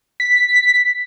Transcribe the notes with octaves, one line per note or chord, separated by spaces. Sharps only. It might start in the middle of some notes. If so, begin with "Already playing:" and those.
B6